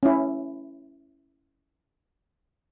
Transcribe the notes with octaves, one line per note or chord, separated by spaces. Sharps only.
C#4 E4